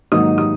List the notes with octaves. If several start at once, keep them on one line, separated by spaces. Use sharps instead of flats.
G#2 D#3 F#3 A#3 D#4 D#6
D#6